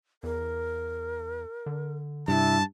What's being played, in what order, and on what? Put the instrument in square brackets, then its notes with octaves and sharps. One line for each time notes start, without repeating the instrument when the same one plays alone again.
[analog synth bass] E2 [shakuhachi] A#4
[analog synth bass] D3
[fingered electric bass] G2 [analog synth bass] C3 [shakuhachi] E4 [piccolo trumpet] A5